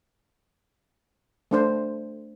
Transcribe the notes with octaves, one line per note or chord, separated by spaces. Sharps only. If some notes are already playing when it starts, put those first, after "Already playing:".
A3 D4 C5